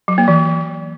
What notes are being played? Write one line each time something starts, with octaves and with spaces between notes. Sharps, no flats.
F#3
A#3
E3